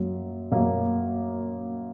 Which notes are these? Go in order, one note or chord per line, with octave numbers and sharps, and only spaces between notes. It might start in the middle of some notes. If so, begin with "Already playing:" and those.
Already playing: F#2 F#3 A#3
F#2 F#3 A#3